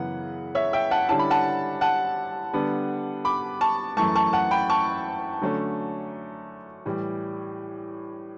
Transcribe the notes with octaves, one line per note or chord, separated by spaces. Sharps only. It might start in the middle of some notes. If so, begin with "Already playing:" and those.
Already playing: F#2 C#3 E3 B3 F#5
C#5 E5
E5 G5
F#5 A5
D3 G3 C#4 E4 A5
B5
F#5 A5
F#5 A5
D3 G3 B3 D4
B5 D6
A5 C#6
F#2 E3 A3 A5 C#6
A5 C#6
F#5 A5
G5 B5
A5 C#6
D3 F#3 A3 C#4
A2 E3 G3